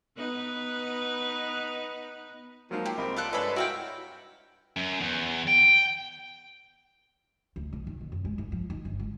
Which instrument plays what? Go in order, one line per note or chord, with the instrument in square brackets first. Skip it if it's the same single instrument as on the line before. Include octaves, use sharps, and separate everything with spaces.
[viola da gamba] B3 D#4 B4
[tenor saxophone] F3 [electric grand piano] F#3 G#3 D#4 [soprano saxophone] A#3
[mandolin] G4
[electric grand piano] C2 D#5 B5 [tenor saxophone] A#3 [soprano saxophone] C4
[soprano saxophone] F4 [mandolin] A4 D5 F#6
[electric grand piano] G2 C#5 D5 [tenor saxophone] G#3 [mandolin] A4 B5 [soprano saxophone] B4
[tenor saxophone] E4 [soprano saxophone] F#4 [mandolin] A#4 F5 G5
[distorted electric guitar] F#2
E2
G5
[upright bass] D2
B1
D#3
A#2
F#2
G#3
G#2
F3
D#3
G1
G#3